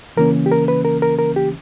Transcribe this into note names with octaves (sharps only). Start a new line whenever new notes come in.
C#3 E3 A#3 C#4 A#4
G4
A#4
B4
A#4
A#4
A#4
G4